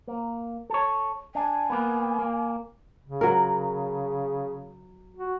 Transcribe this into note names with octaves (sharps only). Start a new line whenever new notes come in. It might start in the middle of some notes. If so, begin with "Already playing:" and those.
A#3
A4 C#5
D4 G#5
A#3 B3
A#3
C#3
F#3 A#4
F#4